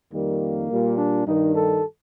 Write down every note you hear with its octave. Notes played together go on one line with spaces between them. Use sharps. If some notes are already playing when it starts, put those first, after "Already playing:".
F2 D#3 G3 A#3
A#2 G3
D4
G2 D#3 G3 D#4
A4